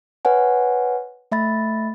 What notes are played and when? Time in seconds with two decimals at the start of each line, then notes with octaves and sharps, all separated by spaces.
0.25 B4 C#5 F#5 G#5
1.32 A3 E5 B5 A6